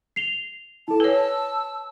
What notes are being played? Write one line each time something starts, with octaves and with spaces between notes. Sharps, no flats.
C7 F7 G7
E4 A4 A5
B4 C#5 G#5 E6